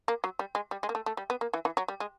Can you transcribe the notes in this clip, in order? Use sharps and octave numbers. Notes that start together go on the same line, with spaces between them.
A#3
F#3
G3
G#3
G3
G#3
A#3
A3
A3
G3
B3
A#3
E3
E3
F#3
G3
G#3